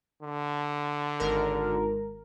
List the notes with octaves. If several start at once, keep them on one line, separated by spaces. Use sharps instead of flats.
D3
G#1 A#4